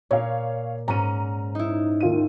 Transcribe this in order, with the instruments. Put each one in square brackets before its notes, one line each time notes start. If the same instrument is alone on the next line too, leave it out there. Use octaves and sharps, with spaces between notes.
[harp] A#2 [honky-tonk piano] C#5 F5
[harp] G#2 C#4 [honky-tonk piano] A#5 D#7
[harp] D#4 E4
[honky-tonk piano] D#2 F4 D#7